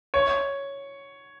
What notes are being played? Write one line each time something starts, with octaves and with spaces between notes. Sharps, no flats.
C#5